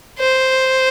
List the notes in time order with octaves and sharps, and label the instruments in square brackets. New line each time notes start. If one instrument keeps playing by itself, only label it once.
[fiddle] C5